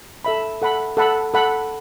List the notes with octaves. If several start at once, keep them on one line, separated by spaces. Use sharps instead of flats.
A4 E5 B5
A4 F#5 B5
A4 F#5 B5
A4 F#5 B5